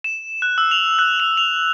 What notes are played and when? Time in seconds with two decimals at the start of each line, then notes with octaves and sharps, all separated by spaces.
0.04 E7
0.42 F#6
0.58 E6
0.71 F7
0.99 F#6
1.20 F7
1.37 F7